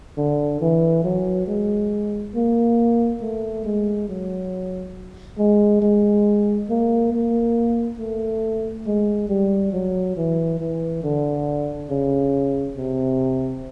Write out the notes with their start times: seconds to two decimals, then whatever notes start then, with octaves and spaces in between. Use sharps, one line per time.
0.17 D3
0.61 E3
1.04 F#3
1.48 G#3
2.35 A#3
3.21 A3
3.65 G#3
4.08 F#3
5.38 G#3
5.82 G#3
6.69 A#3
7.12 A#3
7.99 A3
8.86 G#3
9.29 G3
9.73 F#3
10.17 E3
10.60 E3
11.04 D3
11.90 C#3
12.77 C3